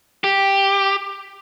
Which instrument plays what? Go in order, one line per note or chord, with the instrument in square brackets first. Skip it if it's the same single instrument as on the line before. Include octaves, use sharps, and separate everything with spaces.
[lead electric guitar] G4